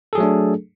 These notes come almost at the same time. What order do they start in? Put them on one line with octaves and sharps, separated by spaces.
A4 G#4 F#3 A3 D4